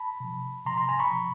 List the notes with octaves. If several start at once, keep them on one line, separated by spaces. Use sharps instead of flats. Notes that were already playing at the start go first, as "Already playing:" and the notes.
Already playing: A5 B5
C3 F3
C3 F3 A#5 C6
A#5 C6
G#5 A#5
B5 C#6
C3 F3